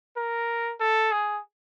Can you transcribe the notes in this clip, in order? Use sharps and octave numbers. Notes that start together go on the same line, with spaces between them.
A#4
A4
G#4